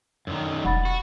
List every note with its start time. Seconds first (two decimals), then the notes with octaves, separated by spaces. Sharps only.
0.27 F#2 D3 D#3
0.65 E1 F#5 B5 A6
0.85 F#4